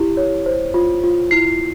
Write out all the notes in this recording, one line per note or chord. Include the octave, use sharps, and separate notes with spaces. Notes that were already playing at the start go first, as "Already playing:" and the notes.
Already playing: E4 G4
C#5
C5
F4
F4
E4 C7